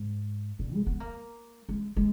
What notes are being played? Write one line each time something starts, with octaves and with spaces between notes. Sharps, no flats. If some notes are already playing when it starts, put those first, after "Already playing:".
Already playing: G#2
A#2
G#3
B3
A#3
G#3
G#3